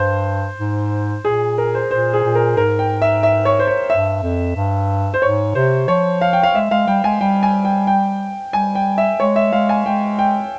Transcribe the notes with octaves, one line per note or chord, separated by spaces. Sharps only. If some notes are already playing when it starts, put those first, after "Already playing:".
Already playing: G2 C5
G#2
A#2 G#4
A#4
C5
A#2 C5
G#4
A#2
A#4
G#2 A#4
G5
E5
E5
C#5
C5
C#5
G2 E5
F2
G2
C5
G#2 C#5
C3 C5
F3 C#5
F5
G5
F5
G#3 E5
G#3 F5
G3 G5
G#3 G#5
G3 G5
G#5
G5
G5
G3 G#5
G5
E5
G#3 C#5
E5
G#3 F5
G#5
G#3 G5
G5